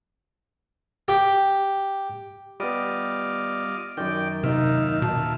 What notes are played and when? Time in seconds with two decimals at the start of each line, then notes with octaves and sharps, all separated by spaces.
1.08 G4
2.60 G3 B3 F4 D#5 D6
3.97 F#2 D#3 D5 G5
4.43 D#2 C3 D#4 F4 E5
5.02 B2 A5